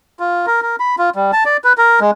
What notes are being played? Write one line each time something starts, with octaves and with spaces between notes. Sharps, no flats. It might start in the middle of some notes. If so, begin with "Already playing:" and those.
F4
A#4
A#4
B5
F4
G3
A5
D5
B4
A#4
G#3